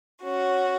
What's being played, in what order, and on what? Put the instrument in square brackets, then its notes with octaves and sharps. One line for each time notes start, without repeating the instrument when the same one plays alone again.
[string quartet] C#4 F#4